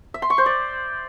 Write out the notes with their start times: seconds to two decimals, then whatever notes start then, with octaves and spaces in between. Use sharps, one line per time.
0.14 E5
0.22 C6
0.30 C#6
0.38 C5
0.46 D5